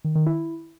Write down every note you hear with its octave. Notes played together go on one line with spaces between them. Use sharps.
D#3
D#3
E4